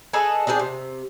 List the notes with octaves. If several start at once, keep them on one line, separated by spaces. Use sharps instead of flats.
G#4 A4 B4 D#5
C4 D4 G4 G#4
C3